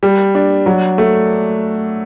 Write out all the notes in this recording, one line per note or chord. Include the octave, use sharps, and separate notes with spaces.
G3
D4
F#3
A3